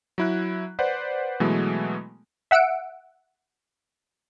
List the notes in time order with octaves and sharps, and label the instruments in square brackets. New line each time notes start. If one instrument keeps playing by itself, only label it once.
[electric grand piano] F#3 E4 F#6
B4 C5 D5 F#5
B2 E3 F#3 G#3 A3 B3
[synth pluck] E5 F#5 E6 C#7 D7